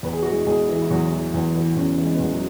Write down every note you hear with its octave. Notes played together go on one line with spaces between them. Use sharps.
E2 B4
G#4
E3 F#4
G#3 G#4
E2 G#3 G#4
E3
E4
E2 F#3 F#4
E3
E2
E3
E2 C#3 C#4
E3
G#3
B3
E2 G#3
F#3